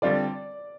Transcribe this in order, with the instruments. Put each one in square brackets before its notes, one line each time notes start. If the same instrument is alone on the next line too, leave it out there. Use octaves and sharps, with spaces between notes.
[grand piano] D3 G3 C4 F4 [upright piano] D5